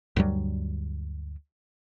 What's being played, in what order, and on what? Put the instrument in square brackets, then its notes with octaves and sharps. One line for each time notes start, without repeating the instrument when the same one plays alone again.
[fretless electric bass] D2 G2 F#3 G3